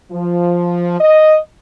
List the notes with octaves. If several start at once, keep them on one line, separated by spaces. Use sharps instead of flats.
F3
D#5